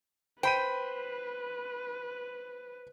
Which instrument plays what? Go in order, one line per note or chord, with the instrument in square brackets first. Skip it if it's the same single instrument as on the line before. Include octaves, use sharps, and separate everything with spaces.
[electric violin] B4 [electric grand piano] C5 B5 D#7 [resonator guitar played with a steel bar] G5